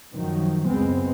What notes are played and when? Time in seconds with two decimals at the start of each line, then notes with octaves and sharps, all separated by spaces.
0.14 F#2 D#3 F3 F#3
0.67 C#2 F#2 G#3 B3 C4